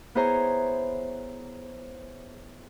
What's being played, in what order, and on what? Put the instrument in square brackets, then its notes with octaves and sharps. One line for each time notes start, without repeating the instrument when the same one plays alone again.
[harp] B3 E4 G#4 C5 C#5 A#5